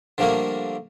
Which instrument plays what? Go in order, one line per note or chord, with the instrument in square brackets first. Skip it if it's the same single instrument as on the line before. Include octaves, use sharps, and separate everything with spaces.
[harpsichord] D3 F3 G3 A3 A#3 A#4